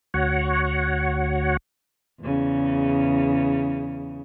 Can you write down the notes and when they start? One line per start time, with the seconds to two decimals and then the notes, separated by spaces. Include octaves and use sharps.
0.14 D2 F#4 C#5 F#5
2.21 E2 C#3